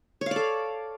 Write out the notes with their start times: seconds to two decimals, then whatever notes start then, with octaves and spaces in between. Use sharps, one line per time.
0.21 C#5
0.26 F5
0.31 D5
0.36 A4